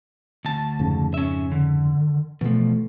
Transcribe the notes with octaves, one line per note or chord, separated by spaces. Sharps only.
D2 A5
F2 G#2 C#3
C#4 E5
D3
B2 E3 F3 A3